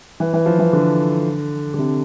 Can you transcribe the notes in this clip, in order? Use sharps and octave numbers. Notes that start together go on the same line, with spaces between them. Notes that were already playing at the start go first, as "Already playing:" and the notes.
E3
E3
F3
E3
D3
D3
C3